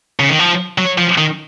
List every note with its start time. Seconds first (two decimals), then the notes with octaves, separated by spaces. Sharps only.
0.20 C#3
0.29 D#3
0.39 F3
0.78 F#3
0.98 F3
1.18 D#3